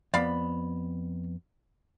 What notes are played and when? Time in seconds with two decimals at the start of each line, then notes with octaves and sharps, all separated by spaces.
0.14 F2 B3 D5 F5 B5